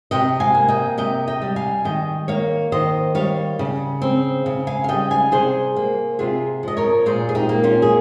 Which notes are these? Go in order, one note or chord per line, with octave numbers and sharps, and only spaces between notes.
C3 D#5 G5
F5 G#5
A#3
D#5 G5
C3 D#5 G5
D#5 G5
G3
F5 G#5
D#3 D#5 G5
A#3 C#5 F5
D#3 C5 D#5
G3 C#5 F5
C#3
C4
C#3
F5 G#5
F5
G3 D#5 G5
F5 G#5
C3 G#4 C5
A#3
C3 F4 G#4
F3 D#5
A#4 C#5
A#2 G#4 C5
G#4
D#4 G4
A#3
C#4 F4
G#4